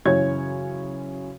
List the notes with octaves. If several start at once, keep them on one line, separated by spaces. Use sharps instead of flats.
F#2 C#3 E3 C#5 G#6